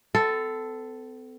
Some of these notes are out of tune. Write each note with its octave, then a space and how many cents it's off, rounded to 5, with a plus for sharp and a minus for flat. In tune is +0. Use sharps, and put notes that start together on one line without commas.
C4 -45 A4 +0